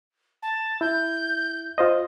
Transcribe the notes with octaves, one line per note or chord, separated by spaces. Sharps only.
A5
E4 G6
F4 C5 D#5